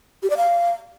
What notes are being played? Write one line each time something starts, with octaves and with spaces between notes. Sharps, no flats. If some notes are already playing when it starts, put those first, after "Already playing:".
G4
D5
F5